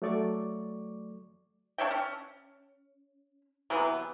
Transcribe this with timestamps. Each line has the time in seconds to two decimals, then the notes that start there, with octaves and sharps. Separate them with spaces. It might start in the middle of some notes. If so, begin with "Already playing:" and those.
0.02 F#3 A3 D5 C#6 D6
1.78 D4 C#5 E5 G5
1.91 C#4
3.70 C3 E3 F#3 B3